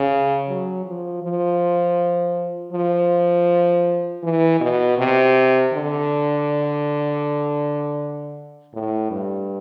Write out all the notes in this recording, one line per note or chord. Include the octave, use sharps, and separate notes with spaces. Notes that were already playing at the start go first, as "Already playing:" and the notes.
Already playing: C#3
F#3
F3
F3
F3
E3
B2
C3
D3
A2
G2